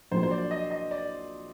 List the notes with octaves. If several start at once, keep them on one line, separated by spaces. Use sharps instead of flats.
A#1 A#2 F#3 A#3 C5
C5
D5
D#5
D#5
D5